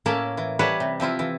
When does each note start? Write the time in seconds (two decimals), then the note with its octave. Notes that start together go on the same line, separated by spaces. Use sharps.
0.06 A2 A#3 C#4 A#4 E5 A5
0.37 E3
0.59 E3 G3 B4 C#5 F#5 A5
0.80 C3
1.00 F3 C4 E4 F4
1.19 E3